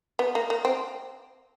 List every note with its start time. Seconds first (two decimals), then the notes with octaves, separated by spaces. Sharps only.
0.19 B3
0.35 A#3
0.50 A#3
0.65 C4